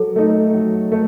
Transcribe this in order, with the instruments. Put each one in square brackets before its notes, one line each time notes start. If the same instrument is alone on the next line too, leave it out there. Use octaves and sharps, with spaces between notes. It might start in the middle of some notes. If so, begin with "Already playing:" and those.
Already playing: [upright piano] F#3 [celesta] A4
[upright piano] A3 D#4
F#3
A3